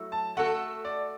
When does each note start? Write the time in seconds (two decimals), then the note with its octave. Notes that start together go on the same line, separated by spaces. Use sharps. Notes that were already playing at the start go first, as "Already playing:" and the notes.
Already playing: F#3 A3 E4
0.12 A5
0.37 A3 F#4 A4 F#5
0.85 D5